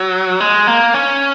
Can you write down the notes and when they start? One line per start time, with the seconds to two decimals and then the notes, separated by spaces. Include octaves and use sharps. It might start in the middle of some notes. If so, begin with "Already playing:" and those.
Already playing: F#3
0.40 G#3
0.67 A#3
0.94 C#4